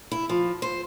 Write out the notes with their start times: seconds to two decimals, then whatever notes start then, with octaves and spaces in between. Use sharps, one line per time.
0.11 E4
0.29 F3
0.62 C5